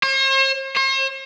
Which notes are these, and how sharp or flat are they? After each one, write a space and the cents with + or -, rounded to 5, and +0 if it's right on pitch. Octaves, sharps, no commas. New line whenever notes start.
C5 +45
C5 +45